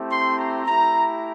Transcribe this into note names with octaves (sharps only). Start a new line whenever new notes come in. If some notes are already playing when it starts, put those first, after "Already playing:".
Already playing: A3 C4 E4 G4
C6
A#5
A3 E4 G4 A#5